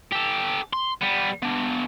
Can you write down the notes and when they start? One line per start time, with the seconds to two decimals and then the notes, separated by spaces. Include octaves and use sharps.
0.13 G4 A4
0.73 C6
1.01 G3 B3
1.42 B3 D4